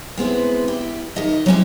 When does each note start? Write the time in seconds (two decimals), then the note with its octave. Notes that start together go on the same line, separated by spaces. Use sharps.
0.17 G#3 B3 C4 E4
0.68 E4 G4
1.16 D#3 G4 D#5 E5
1.46 F#3 G#3 C4 C#4 E4 G4